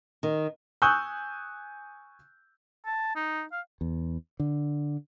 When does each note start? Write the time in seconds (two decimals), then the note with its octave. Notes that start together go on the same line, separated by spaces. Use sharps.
0.23 D#3
0.82 G#5 C#6 D#6 E6 F#6 G6
2.86 A5
3.16 D#4
3.52 F5
3.81 E2
4.40 D3